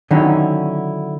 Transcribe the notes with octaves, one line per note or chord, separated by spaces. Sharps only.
D3 D#3 F#3 C#4 D#4 E4